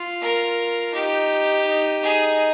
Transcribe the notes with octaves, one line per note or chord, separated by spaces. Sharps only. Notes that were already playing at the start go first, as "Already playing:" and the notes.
Already playing: F4
A#4
D#4 G4
D#4
D#4 G#4